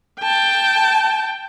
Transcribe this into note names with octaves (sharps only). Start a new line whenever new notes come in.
G5 A5